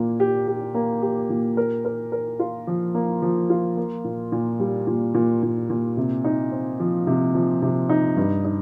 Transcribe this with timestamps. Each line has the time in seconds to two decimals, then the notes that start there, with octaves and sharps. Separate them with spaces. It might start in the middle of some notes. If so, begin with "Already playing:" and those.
Already playing: A#2 A#3
0.20 G4
0.48 G4
0.75 A#3
1.02 G4
1.30 A#2
1.57 A#4
1.85 A#4
2.12 A#4
2.40 F4
2.67 F3
2.95 A#3
3.22 F3
3.50 F4
3.77 A#3
4.05 A#2
4.32 A#2
4.60 G3
4.87 A#2
5.14 A#2
5.43 A#2
5.70 A#2
5.97 C3
6.25 D#4
6.52 C4
6.80 F3
7.07 C3
7.35 F3
7.62 C3
7.89 D#4
8.17 G2
8.44 D#4